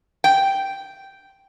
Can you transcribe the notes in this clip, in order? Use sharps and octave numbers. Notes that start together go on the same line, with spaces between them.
G5